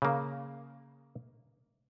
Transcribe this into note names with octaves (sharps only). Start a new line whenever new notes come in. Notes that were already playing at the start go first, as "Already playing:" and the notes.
C#3 A#3